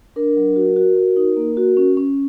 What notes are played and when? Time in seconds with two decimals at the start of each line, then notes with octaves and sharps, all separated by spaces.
0.16 D4 A#4
0.37 F#3
0.56 F#4
0.76 F#4
0.96 F#4
1.17 D#4
1.37 A#3
1.57 F#4
1.77 C#4
1.97 C#4